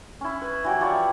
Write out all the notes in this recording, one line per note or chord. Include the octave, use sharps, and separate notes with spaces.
C#4 E4
B4
E3 F#3 G4
F3 E4 C#5 D5